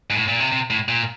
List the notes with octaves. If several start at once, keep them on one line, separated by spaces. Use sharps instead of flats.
G#2
A2
A#2
C3
C3
A2
A#2